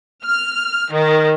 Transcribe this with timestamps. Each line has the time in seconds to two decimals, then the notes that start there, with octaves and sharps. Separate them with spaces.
0.23 F6
0.91 D#3